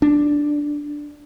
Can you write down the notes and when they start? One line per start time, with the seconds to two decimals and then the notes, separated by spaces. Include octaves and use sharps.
0.02 D4